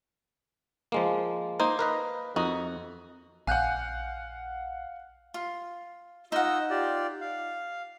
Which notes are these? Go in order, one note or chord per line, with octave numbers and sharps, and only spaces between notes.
F3 G#3 A#3
A#3 D#4 C5
A#4 B4 D#5
F2 D#4 F#4
A#1 F5 F#5 G#5 F#6 G6
F4
D#4 F4 D#5 F#5 E6
F4 G4 D5
F5